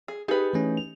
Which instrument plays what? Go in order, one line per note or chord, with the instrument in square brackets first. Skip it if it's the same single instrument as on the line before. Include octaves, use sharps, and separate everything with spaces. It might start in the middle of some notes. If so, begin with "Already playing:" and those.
[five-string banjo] G#4
[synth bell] D#4 G4 [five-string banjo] G#4 B4
[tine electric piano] E3 A3 C#4
[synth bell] F7